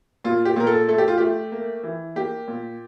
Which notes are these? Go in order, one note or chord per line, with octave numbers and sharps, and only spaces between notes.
A#2 F4
G4
A#2 A#4
A4
A3 A4
G4
F4
A3 G4
A#3
E3
A#3 G4
A#2